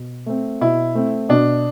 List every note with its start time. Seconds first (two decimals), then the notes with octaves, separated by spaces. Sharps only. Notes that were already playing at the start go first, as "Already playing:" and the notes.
Already playing: B2
0.26 A3 C4
0.61 B2 E4
0.95 A3 C4
1.29 B2 D4